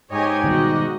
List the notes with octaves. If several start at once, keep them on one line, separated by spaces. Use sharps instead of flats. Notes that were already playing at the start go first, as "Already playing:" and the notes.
G#2 G4 C#5 D#5 G#5
B2 D#3 G3 F#4 D#5